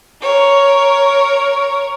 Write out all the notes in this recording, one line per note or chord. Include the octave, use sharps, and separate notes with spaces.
A#4 C#5